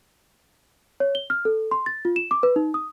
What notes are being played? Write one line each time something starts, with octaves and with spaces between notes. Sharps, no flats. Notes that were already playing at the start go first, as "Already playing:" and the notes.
C#5
G7
F6
A4
C6
A6
F4
E7
D6
B4
D#4
D#6